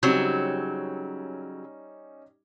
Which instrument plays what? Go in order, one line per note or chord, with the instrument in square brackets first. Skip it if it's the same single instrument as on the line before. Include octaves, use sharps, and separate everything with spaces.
[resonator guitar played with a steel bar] C#3 F#3 C4 [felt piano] G3 C#4 D#4